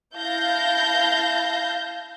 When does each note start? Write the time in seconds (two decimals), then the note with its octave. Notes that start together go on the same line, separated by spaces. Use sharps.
0.15 E4 F5 A5 G6 A#6